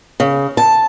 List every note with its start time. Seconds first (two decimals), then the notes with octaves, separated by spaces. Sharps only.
0.20 C#3
0.57 A5